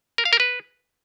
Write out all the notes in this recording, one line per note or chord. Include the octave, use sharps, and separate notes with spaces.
A#4
F5
A#4
B4